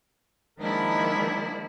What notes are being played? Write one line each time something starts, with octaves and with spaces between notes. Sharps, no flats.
D#3 F3 G#3 A#3 D4 E4